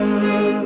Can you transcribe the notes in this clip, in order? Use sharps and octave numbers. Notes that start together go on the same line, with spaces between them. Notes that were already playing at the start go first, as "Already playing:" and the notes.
Already playing: D#3 G#3 C4
G#4